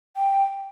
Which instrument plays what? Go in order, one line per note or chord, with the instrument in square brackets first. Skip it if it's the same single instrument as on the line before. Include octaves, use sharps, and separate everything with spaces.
[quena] G5